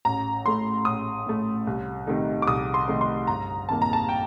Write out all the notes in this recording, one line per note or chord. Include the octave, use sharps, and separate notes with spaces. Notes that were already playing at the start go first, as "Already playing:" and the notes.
A1 A#5
A2 A3 C6
A1 D#6
A2 A3
C2
C3 D#3 A3 D#4
D6
C2 D#6
C6
C3 D#3 A3 D#4
C6
G1 A#5
F2 C3 D#3 A#3 A5
A#5
A5
G5